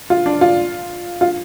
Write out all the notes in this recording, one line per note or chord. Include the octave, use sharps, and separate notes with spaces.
F4
D4
F4
F4